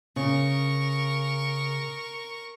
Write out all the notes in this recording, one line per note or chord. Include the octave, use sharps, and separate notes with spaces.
C#3 A#4 C#6